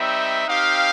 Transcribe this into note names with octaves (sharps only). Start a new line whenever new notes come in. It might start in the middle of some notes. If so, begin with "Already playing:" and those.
Already playing: G3 C4 D#4 E5
C4 D#4 G4 F5